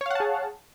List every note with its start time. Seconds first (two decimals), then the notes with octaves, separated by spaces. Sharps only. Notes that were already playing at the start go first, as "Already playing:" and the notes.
0.01 C#5
0.06 F5
0.11 F#5
0.15 A5
0.20 G#4